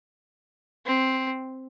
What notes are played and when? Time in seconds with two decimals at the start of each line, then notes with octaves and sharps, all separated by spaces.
0.86 C4